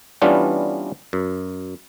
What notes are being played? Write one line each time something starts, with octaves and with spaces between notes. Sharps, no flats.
E3 G3 B3 C#4 D4 F4
F#2